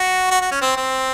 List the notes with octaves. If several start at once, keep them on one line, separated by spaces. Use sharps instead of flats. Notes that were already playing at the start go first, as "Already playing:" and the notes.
Already playing: F#4
F#4
F#4
C#4
C4
C4